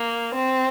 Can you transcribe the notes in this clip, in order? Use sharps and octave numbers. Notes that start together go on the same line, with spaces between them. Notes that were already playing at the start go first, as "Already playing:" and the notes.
Already playing: A#3
C4